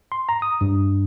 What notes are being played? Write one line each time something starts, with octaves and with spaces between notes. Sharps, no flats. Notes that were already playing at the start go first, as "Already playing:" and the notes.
C6
A#5
D#6
G2